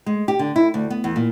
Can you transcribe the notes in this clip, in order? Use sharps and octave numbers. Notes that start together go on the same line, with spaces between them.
G#3
G4
D3
E4
D2
B3
E2
A#2